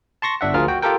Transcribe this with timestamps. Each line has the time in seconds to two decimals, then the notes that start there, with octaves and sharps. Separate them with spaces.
0.22 A5 C6 C#6 A#6
0.41 G1 D4 E5 F#5
0.54 D2 F3 F4 G#4 A#4 F6
0.68 F#4 G5
0.82 F4 G4 A4 A#4 G5